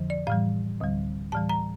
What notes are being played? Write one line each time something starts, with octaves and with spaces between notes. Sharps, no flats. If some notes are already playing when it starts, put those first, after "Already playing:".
Already playing: F2 D3 F3
D5
A2 E3 G3 F5
D2 D3 G3
A2 E3 G3 A5
A#5